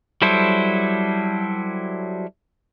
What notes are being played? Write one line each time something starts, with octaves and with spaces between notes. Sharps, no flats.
F#3 G3 E4 A4 C5